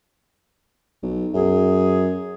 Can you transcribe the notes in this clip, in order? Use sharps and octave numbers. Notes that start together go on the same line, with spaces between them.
B1
F#2 G#4